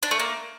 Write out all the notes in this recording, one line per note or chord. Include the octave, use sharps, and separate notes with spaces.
D4
A3
A#3